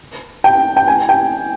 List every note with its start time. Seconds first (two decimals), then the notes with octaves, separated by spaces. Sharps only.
0.44 G5
0.77 G5
0.88 G#5
1.09 G5